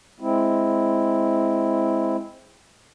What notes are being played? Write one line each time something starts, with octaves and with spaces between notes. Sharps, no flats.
G#3 C4 E4